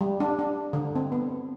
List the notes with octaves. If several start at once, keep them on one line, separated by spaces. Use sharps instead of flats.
G3
D4
D4
D3
C4
B3